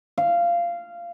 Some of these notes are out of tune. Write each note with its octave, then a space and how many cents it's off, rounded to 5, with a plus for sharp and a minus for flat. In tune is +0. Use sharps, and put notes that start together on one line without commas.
F5 -15